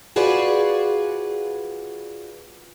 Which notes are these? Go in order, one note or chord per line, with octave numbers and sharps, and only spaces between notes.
F4 F#4 G#4 B4 C5 D5